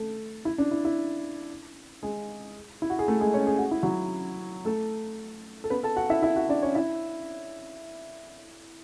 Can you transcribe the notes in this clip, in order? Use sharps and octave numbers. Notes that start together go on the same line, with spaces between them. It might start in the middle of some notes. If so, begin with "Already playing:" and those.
Already playing: A3 A4
E4
D4
E4
E4
G#3 G#4
E4
F#4
G#4
A3 A4
G#3 G#4
C#4 C#5
G#4
F#4
E4
F#3 F#4
A3 A4
A4
B3 B4
A4 A5
F#4 F#5
E4 E5
E4 E5
F#4 F#5
D4 D5
C#4 C#5
E4 E5